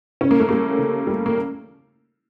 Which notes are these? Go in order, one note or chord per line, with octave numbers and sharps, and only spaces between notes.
C#3 C#4
A#3
A3
G3 A#3
C#3
G3
A#3